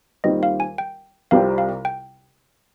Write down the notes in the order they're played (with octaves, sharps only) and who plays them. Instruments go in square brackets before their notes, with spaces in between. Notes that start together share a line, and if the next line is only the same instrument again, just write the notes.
[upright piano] D#2 D#3 G3 C4 F4 [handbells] D#5
[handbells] F5
G#5
G5
[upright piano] C2 C3 G3 C4 F4 [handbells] F5
[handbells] F5
G5